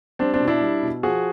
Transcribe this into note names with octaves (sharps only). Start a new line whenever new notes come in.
G3 C4 D4
C4 D4
B2
D4 E4
G3
B2
F3 F#4 G#4